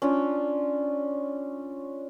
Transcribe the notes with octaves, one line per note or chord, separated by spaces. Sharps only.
C#4 D4 F4